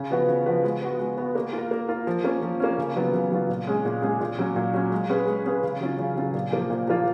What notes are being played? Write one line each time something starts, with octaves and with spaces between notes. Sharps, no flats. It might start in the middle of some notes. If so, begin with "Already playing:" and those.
Already playing: C#3
F3 B3 F#4 B4
C#3
F3 B3 F#4 B4
G#3
B3 F#4
G#3
B3 F#4
A#3
F4
A#4
A#3
F4 A#4
F3
A#3 C#4
F3
A#3 C#4
C#3
F#3 B3 F4
C#3
F#3 B3 F4
A#2
G#3 C#4 G#4
A#2
G#3 C#4 G#4
A#2
F#3 C#4
A#2
F#3 C#4
G#3
C#4 G#4 B4
G#3
C#4 G#4 B4
C#3
F#3 C#4 F4
C#3
F#3 C#4 F4
A#2
F3 A#3 F4
A#2
F3 A#3 F4